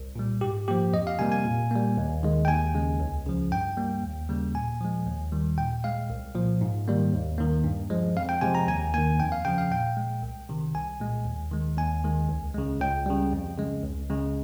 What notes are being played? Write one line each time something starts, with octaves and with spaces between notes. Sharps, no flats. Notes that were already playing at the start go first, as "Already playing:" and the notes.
Already playing: C2
A#2 G3
G#2 G4
F3 A#3 G4
F2 D#5
F5
C3 G3 A#3 G#5
G#5
A#2
G3 A#3
D#2
D#3 G#3
G5
D#2 G#5
C#3 G#3
C#2
C#3 F3
G2 G5
G3 A#3
D#2
C#3 G3 A#3
A#2 G#5
F3 G#3
D#2
D#3 G3
A#2 G5
G#3 F5
C2
A#2 F3
G#2
D#3 G3 A#3
D#2
D#3 A#3
G2
F3 G#3
F2 F5
G5
C3 F3 G#3 G#5
A#5
D#2 G#5
D#3 A#3 G#5
F2 G5
F5
C#3 F3 G5
F5
A#2 G5
G#3
C2
C3 D#3
C2 G#5
A#2 G#3
D#2
D#3 G#3
D#2 G#5
D#3 G#3
C#2
C#3 G#3
C#2 G5
C#3 G3
F2
C#3 G#3
C#2
C#3 G#3